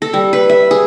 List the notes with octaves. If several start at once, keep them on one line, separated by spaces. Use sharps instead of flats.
A4
G3
B4
E5
G#4